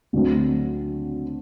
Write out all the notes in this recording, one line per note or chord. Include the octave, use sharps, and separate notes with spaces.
D2 D3 F#3 A3 C4